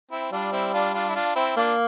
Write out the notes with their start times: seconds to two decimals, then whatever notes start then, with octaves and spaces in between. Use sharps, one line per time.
0.11 C4 E4
0.32 G3 D4 F4
0.52 C4 E4
0.74 D4 F4
0.94 D4 F4
1.09 E4
1.16 D4 F4
1.36 C4 E4
1.57 A#3 D4 F4